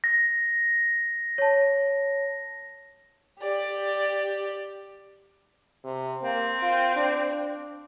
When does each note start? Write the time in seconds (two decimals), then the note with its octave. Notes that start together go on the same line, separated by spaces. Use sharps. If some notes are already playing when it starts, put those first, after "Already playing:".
0.04 A#6
1.38 C#5 A5
3.39 G4 D5
5.84 C3
6.23 A#3 C4
6.62 F4
6.96 D4